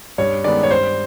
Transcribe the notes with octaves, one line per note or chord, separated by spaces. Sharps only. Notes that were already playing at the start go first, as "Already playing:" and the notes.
G2 C#5
D#3 G#3 B3 D5
C#5
G2 C5